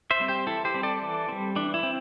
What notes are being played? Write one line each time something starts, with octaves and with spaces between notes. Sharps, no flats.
C5 E5
G3 C4
G4 C5
E3 E4 A4
G4 C5
G3 C4
A4 D5
E3
G3 C4
E3 D4
E4
C4